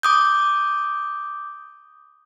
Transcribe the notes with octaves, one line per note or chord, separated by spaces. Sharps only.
D6 D#6 G6